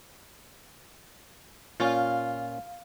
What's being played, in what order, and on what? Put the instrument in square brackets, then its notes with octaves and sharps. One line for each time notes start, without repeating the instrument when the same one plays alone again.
[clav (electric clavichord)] A#2 C#4 [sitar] F4